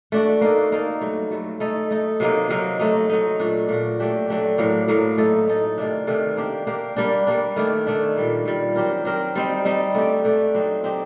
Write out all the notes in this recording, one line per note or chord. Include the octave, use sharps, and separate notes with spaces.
A3 D4 F#4
A#3 D#4 A4
A#3 D#4 A4
G2 F#3 A3
G2 F#3 A3
A3 D#4 A4
A3 D#4 A4
C3 F#3 A#3 D#4
C3 F#3 A#3 D#4
F#3 A3 D#4
F#3 A3 D#4
A#2 A3 D4 F#4
A#2 A3 D4 F#4
F#3 A3 D4 G4
F#3 A3 D4 G4
A2 F#3 A#3
A2 F#3 A#3
A3 D#4 A4
A3 D#4 A4
C3 D#3 A3 D4
C3 D#3 A3 D4
A#3 D4 G4
A#3 D4 G4
G3 A#3 D4
G3 A#3 D4
D#3 A3 D4
D#3 A3 D4
A#2 G3 A#3
A#2 G3 A#3
F#3 C4 G4 A#4
F#3 C4 G4 A#4
G3 C4 D#4
G3 C4 D#4
A3 D4 G4 D5
A3 D4 G4 D5
F#3 C4 D#4 G4
F#3 C4 D#4 G4